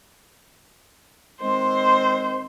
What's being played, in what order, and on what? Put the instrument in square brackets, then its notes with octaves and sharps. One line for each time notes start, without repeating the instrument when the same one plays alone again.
[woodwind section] D#3 G#3 C4 [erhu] C5